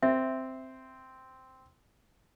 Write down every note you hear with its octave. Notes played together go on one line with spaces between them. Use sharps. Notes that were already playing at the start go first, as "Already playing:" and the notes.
C4 E5